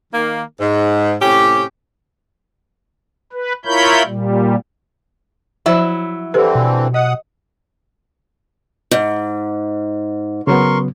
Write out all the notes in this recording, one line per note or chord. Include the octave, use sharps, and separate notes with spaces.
D#3 A#3
G#2
A2 C3 C#4 G4
B4
E4 F4 A#4 C#5 B5 G6
A#2 G3
F3 F#3 E4 C5 E5
D3 E3 C4 G4 A4 B4
B2
D#5 F#5 D#6
G#2
C#3 F#3 B3 A#4 C6 C#6